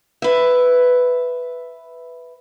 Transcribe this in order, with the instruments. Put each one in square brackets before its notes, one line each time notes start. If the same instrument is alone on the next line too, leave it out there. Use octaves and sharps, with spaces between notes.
[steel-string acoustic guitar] B4 E5